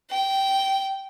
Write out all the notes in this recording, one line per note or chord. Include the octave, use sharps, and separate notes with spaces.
G5